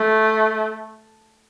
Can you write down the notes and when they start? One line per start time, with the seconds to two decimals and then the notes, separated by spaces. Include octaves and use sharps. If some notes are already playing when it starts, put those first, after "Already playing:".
Already playing: A3